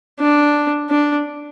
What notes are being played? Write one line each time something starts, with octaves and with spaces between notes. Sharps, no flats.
D4
D4